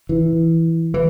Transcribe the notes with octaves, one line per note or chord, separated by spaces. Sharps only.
E3
E3